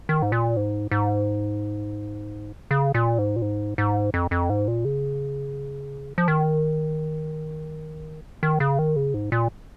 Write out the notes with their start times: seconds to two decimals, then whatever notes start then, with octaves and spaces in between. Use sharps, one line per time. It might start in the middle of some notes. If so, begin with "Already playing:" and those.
0.09 D#3
0.22 G#2
0.32 A#2
0.57 G#2
0.91 G#2
2.71 C#3
2.94 A#2
3.18 G#2
3.36 A#2
3.42 G#2
3.78 G#2
4.14 F2
4.31 F2
4.50 G#2
4.68 A#2
4.85 C#3
6.18 F3
6.28 D#3
8.43 D#3
8.60 C#3
8.79 D#3
8.96 C#3
9.14 G#2
9.32 A#2